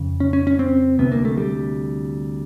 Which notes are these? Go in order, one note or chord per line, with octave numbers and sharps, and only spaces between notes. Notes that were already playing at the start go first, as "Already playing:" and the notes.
Already playing: F2 C#3
C#4
C#4
C#4
C4
D2 C3 B3
A#3
A3
G3